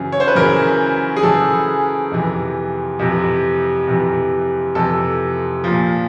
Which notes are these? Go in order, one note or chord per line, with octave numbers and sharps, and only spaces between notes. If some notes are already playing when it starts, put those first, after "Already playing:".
Already playing: F#2 C#3 E3
C#5
C5
B4
F#2 C#3 E3 A#4
G#4
F#2 C#3 E3 A4
F2 C3 E3
F2 C3 E3
F2 C3 E3
F2 C3 E3 A4
A#2 F3